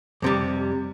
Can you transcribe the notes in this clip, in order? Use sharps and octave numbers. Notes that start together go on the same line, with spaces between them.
F2 C3 G3